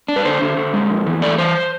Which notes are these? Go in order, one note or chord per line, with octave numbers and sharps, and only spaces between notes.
D4
B4
D3 C5
D3
D3
G#3
F2
E3
A3 D5
E3 C5